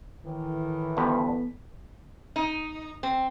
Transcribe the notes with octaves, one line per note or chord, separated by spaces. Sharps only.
A2 D#3 E3
D2 G2 F3 B3 A4 B6
D#4
C4